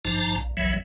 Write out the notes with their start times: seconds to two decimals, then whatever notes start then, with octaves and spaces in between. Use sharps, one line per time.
0.05 G#1 G2 F3 D#4 A5 A#5
0.38 A#1
0.57 F#1 B1 E2 E3 F#3 E5